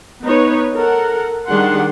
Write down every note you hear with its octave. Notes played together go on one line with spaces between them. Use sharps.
B3 D#4 B4 C#5
A4 A#4 F#5
D#3 G3 D4 G#4 F#5 C6